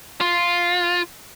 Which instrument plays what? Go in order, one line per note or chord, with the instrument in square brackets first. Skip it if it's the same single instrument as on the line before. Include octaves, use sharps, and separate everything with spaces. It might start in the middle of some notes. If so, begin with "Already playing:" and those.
[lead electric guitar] F4